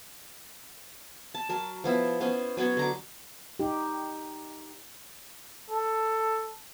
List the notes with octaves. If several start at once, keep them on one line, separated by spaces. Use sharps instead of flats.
A5
F#3 A#4 A5
F3 B3 E4
B3 C#4 C5
F#3 B3 F#4 C#5
D3 A#5 D6
D#4 G4
A4